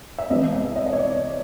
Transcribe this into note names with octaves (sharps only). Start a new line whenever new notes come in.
E5
C2 C3 E3 G#3 B3 D#5
E5
D#5
D#5
C#5
D5
D5